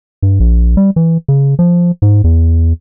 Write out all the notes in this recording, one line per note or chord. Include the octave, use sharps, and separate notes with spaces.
G2
A#1
G3
E3
C#3
F3
G#2
E2